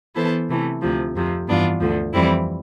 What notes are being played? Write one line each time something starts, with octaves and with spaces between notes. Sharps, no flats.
E3 B3 E4 A4 C5
C3 E3 A3
D2 C3 F3
F2 C3 F3
G2 E3 B3 D4 F4
D2 D3 F3
F2 E3 G3 C4 E4